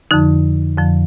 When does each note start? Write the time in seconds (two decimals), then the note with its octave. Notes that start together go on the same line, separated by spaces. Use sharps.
0.11 F2 D3 F3 D#4
0.77 F2 D3 F3